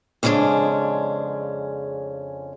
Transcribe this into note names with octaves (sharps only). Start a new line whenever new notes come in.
F2 C#3 G#3 C#4 D4